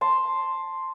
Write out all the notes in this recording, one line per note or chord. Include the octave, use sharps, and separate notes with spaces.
A5 C6